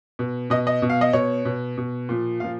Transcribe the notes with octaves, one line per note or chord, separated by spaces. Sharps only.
B2
B2 D#5
D#5
B2
F5
D#5
B2 C#5
B2
B2
A#2 F3
A#2 F3 F5